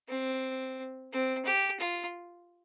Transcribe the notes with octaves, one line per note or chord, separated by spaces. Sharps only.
C4
C4
G4
F4